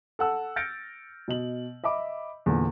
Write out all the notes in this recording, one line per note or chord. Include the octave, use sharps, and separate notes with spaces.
A4 F#5 E6
F6 G6 A6 A#6 C#7 D7
B2 D#5 F#7
D#5 E5 B5 D6
E2 A#2 D3